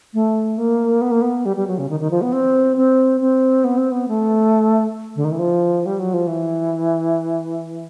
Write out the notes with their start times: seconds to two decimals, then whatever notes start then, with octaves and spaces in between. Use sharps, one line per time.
0.14 A3
0.58 A#3
1.02 B3
1.11 A#3
1.22 B3
1.45 G3
1.57 G3
1.67 F#3
1.78 C#3
1.89 D#3
2.00 D#3
2.11 F3
2.22 B3
2.33 C4
2.77 C4
3.21 C4
3.64 B3
3.78 C4
3.92 B3
4.08 A3
5.16 D3
5.25 D#3
5.32 E3
5.39 F3
5.86 G3
6.00 F#3
6.14 F3
6.27 E3